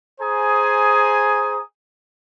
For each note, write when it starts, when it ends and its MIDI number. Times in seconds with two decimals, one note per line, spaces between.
0.21 1.62 68
0.21 1.62 72
0.21 1.62 80
0.21 1.62 82
0.21 1.62 87